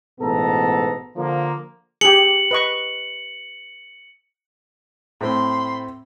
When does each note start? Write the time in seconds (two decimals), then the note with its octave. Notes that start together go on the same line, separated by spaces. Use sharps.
0.20 A1 G#2 B2 B3 A4 A#5
1.16 D3 F3 A#3
2.01 G4 G#4 C#7 F#7
2.51 B4 D#5 C#6
5.21 A2 C4 B5 C6